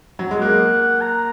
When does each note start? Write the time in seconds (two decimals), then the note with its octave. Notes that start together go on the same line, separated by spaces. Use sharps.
0.19 F#3
0.31 G#3
0.41 A#3 F#5
0.81 F#5
1.01 A#5